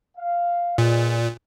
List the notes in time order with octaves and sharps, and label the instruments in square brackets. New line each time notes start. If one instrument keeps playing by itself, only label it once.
[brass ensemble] F5
[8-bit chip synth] A#2 [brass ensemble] G#4 B4 D#5